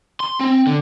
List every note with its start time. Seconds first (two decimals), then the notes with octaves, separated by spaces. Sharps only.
0.20 C6
0.40 C4
0.67 D3